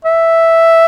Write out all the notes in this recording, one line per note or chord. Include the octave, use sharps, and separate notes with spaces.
E5